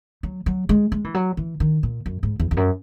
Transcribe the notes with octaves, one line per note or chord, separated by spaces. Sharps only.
F#3
F#3
G#3
G#3
E3
F#3
E3
D#3
A#2
F#2
G#2
E2
E2
F#2